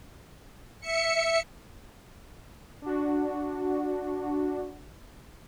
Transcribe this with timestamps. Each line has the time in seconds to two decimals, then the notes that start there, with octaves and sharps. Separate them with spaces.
0.80 E5 C#7
2.82 D4 F#4